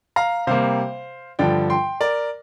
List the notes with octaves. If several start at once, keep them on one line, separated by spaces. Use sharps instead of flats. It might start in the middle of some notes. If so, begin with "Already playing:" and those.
F5 A#5
C3 G3 A#3 C5 F5
G2 D3 F3 D5 G5
G5 C6
A#4 D5